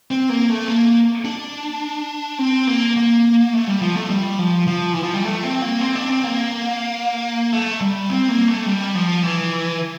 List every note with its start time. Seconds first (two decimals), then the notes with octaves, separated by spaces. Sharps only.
0.11 C4
0.29 A#3
0.49 A3
0.68 A#3
1.25 D4
2.39 C4
2.67 A#3
2.96 A#3
3.53 A3
3.67 G3
3.82 F3
3.95 A3
4.10 G3
4.39 F3
4.68 F3
4.93 E3
5.03 F3
5.14 G3
5.24 A3
5.43 C4
5.62 A#3
5.81 C4
5.95 D4
6.09 C4
6.24 A#3
7.53 A3
7.81 G3
8.09 C4
8.28 A#3
8.47 A3
8.66 G3
8.95 F3
9.23 E3